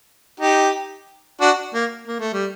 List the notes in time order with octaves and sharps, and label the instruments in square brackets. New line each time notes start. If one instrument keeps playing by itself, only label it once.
[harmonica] D#4 G4
D4 F#4
A#3
A#3
A3
G3